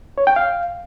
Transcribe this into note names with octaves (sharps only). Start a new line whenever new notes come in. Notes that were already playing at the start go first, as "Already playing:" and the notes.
C#5
G5
F5